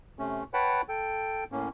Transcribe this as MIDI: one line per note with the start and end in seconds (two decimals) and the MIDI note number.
0.19 0.44 48
0.19 0.44 57
0.19 0.44 61
0.54 0.81 71
0.54 0.81 73
0.54 0.81 78
0.54 0.81 79
0.54 0.81 81
0.54 0.81 83
0.89 1.44 69
0.89 1.44 79
1.52 1.69 45
1.52 1.69 58
1.52 1.69 61